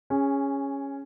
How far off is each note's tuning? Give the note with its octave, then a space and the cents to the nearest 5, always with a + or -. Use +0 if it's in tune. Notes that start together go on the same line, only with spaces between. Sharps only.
C#4 +0 G#4 -20